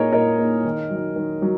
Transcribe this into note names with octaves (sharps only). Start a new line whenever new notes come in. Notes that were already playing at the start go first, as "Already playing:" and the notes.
Already playing: A#2 A#3 D#4 G#4 A#4 C#5 D#5
A#2 A#4 D#5
A#3 D#4
D#3
F#3 D#4
D#3
F#3